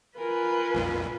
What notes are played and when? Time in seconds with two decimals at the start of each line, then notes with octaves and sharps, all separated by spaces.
0.18 F4 A#4 B4 G#5
0.74 B1 F2 A#2